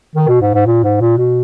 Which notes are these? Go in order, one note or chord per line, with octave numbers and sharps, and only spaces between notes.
D#3
B2
G#2
G#2
A#2
G#2
A#2
B2